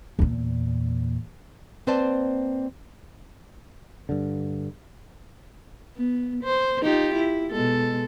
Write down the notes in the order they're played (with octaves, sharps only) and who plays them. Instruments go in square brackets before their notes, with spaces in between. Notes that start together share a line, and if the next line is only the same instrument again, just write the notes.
[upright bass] E2 A#2
[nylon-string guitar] A#3 C4 B4 C5 D5 A5
[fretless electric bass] G2 D3
[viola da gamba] B3
C5
D#4 F4 G4
E4
B2 G#3 A4